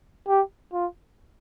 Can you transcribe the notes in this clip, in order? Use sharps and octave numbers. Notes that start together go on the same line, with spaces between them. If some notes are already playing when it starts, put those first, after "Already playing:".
G4
F4